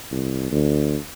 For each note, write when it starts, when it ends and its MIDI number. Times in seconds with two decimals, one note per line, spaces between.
0.12 0.48 36
0.51 0.97 38